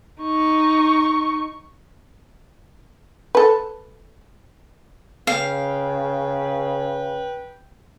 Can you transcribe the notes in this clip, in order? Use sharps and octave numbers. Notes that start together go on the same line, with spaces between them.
D#4 C#6
A4 B4
C#3 B4 F5 G5